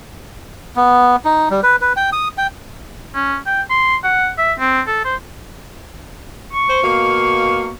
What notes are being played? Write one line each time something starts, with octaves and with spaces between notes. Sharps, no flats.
B3
D#4
G3
B4
B4
G5
D#6
G5
C#4
G5
C6
F#5
E5
C4
A4
C5
C#6
C5
B2 A#3 F5